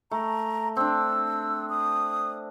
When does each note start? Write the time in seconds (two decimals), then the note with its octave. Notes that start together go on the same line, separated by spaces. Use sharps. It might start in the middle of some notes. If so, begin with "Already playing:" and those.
0.11 A3 A#5
0.77 C4 D4 E6
1.70 D#6